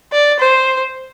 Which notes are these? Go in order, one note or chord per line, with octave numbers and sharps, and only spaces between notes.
D5
C5